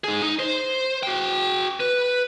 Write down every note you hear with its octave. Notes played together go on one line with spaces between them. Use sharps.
D#4 G#4
D#4
C5
F#4 G5
B4